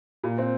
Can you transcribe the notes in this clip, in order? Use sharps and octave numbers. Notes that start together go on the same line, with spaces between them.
A#2
C4